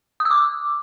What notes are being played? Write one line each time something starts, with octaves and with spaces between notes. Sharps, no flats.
D#6
E6
D6